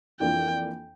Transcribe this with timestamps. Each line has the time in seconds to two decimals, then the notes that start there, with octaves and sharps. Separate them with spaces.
0.20 F2 E3 A#3 D4 F4 G5